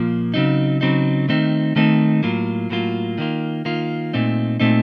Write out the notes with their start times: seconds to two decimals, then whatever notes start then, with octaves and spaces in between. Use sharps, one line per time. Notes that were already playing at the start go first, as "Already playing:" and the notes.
Already playing: A#2 F3 A#3
0.34 C#3 F#3 C4 D#4
0.81 C#3 F#3 C4 D#4
1.29 D#3 A3 C4 D#4
1.76 D#3 A3 C4 D#4
2.23 A2 F#3 A#3 F4
2.70 A2 F#3 A#3 F4
3.18 D#3 A#3 F4
3.65 D#3 A#3 F4
4.13 A#2 A3 C4 D#4
4.60 A#2 A3 C4 D#4